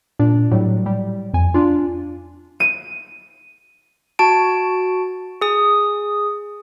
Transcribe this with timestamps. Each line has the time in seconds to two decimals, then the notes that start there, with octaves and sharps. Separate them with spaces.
0.19 A#2 D4
0.51 A2 F#3 G3
0.86 G3
1.34 F2 G#5
1.54 D4 F4
2.60 D#7
4.19 F#4 A5 D7
5.41 G#4 D#6